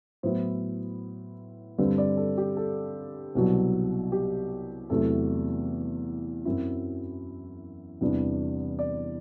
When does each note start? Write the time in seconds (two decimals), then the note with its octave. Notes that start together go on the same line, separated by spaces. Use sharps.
0.23 A2 F#3 B3 E4 C5
1.78 G2 D3 G3 C4 B4
1.98 D5
2.17 A4
2.38 G4
2.57 A4
3.35 C2 B2 F#3
4.12 G4
4.90 E2 C3 F#3 A3 A4
6.45 F#2 F#3 C4 E4
8.01 E2 C3 G3 B3 D4
8.79 D5